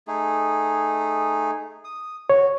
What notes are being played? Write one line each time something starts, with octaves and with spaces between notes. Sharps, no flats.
A3 D#4 G#4
D#6
F#4 C#5